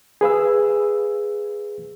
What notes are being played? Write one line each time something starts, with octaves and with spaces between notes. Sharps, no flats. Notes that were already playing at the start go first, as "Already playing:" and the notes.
G#4 B4 F5 E6